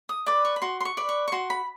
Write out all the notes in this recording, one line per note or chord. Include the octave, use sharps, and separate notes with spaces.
D#6
B4 D5 D6
C#6
B5
F#4 C6
C6
C#6
B4 D5
C#6
C#6
F#4 C6
B5